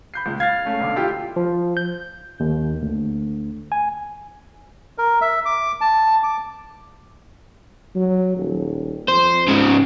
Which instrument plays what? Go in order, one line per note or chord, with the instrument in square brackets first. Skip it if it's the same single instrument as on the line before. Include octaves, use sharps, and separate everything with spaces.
[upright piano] B5 G6 C7
C#2 A#2
[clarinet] F5 [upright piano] G#6 A6
[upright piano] A3 C#4
B1 D3 D6
E4 F4 G4
[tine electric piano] F3
G6
D#2
D2
G#5
[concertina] A#4
E5
D6
A5
D6
[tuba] F#3
D#1
[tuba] F2 [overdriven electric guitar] C5
[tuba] C#2 [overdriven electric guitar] G#2 C#3